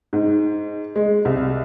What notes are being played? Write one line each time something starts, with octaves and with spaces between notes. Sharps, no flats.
G#2
G#3
C2